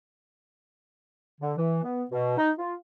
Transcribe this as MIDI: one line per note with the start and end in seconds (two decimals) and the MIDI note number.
1.40 1.52 50
1.57 1.81 52
1.83 2.02 59
2.11 2.35 47
2.37 2.51 63
2.58 2.75 65